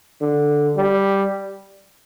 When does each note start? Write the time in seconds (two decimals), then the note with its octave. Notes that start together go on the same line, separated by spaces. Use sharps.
0.21 D3
0.76 G3